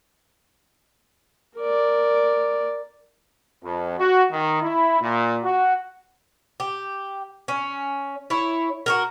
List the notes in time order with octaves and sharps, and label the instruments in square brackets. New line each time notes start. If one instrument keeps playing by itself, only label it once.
[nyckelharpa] A#4 D5
[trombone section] F2
F#4
D#3
E4
A#2
F#4
[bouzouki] G4
C#4
E4 C#5
F#4 G4 A#4